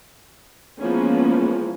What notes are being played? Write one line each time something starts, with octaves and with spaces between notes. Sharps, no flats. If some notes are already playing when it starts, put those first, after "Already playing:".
E3 F3 G#3 A#3 B3 C#4